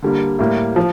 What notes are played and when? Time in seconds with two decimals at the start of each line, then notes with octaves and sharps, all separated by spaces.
0.02 D3 G3 A#3
0.39 A2 G3 A#3
0.76 F3